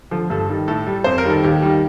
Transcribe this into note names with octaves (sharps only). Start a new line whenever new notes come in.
D3 F3
G2 A4
D#3 G3
A2 A4
G3
F2 C5
A#4
D#3 G3 A4
D#2 G4
D#3 G3